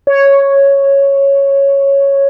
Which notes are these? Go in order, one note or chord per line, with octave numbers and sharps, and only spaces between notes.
C#5